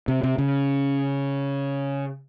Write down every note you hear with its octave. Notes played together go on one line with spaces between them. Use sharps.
C3
C3
C#3